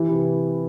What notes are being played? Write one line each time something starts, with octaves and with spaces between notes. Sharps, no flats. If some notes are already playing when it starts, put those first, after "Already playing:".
Already playing: E3 E4 G4 B4
C3